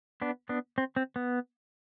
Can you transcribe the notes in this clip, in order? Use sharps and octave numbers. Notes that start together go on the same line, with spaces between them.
B3 D4
B3 D4
C4
C4
B3